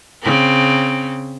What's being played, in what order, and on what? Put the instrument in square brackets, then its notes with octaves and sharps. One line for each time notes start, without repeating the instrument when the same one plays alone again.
[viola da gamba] C#3 C4